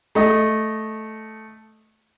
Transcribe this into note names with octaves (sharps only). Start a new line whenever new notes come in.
A3 D#5